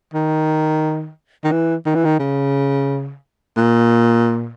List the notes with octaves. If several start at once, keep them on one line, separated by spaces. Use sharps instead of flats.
D#3
D#3
E3
D#3
E3
D#3
C#3
A#2